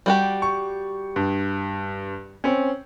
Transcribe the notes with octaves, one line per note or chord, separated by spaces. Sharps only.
G3 F#4 G4
C#6
G2
C4 C#4